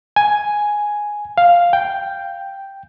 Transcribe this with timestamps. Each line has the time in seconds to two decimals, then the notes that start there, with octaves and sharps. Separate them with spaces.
0.16 G#5
1.38 F5
1.73 G5